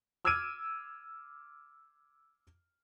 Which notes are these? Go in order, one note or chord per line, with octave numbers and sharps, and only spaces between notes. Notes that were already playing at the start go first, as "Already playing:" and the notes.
D6 E6 F6 G#6 D7 D#7